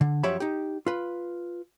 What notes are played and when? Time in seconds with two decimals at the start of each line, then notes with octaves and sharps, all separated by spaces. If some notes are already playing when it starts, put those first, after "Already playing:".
0.01 D3
0.23 F#2 F3 G4 C#5 E5 B5
0.40 D#4 G4
0.86 F4 B4